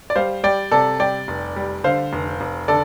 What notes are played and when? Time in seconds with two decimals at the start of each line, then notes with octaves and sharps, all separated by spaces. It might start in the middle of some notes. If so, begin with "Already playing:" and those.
0.10 D5
0.16 G3 C5 F5
0.44 G3 D5 G5
0.71 C3 A4 D5
1.00 G3 D5 G5
1.28 F1
1.56 G3
1.84 D3 C5 F5
2.13 F1
2.41 F1
2.68 D3 A4 D5